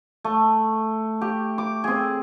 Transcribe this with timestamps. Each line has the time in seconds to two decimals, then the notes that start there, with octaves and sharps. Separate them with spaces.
0.24 A3
1.21 G4
1.58 D6
1.84 C4 G#4